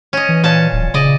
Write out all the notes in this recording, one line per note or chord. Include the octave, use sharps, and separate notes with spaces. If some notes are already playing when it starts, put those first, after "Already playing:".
C#4 D#5
E3
A#2 C#4 A5
D1
C#3 D5 D#5